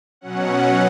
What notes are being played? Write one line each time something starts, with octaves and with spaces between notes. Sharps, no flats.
B2 F#3 C#4 F#5